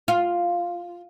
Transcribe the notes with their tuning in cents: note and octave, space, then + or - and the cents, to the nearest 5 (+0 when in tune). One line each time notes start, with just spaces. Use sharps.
F4 +0 F5 +0